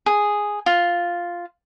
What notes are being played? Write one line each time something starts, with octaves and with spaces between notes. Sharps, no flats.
G#4
F4